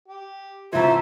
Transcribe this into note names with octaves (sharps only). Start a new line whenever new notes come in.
G4
C2 E3 F4 A4 C5 E5 A#5